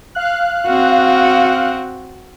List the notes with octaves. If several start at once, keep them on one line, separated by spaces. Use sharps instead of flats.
F5 F#6
C4 F#4